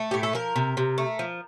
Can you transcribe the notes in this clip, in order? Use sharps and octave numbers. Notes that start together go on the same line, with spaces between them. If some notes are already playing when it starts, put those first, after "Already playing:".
Already playing: A3
A2 G4
A4
F3 A#4
C3
C3
A3
F3